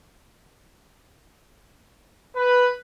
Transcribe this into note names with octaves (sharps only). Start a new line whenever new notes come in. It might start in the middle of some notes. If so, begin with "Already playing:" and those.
B4